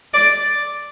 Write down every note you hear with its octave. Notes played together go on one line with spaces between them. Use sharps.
D5